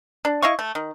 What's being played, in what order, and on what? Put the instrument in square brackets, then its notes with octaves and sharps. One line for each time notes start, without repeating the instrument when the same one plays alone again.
[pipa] D4
E4 D#5 F5 C#6
A3
D#3